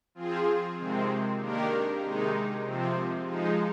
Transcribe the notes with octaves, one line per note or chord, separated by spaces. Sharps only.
F3 C4 F4 G#4
C3 D#3 G#3 C4
D#3 A#3 D4 G4 A#4
C3 D#3 G#3 D#4
C3 F3 C4
F3 G#3 D#4